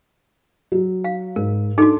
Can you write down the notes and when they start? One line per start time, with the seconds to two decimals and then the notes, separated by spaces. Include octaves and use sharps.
0.72 F#3
1.04 F5
1.36 G#2 A#4
1.78 D4 D#4 F#4 A4 D6